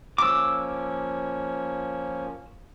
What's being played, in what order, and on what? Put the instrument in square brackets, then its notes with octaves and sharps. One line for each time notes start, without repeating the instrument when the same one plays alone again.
[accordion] F3 A#3 C#4 [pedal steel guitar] D6 E6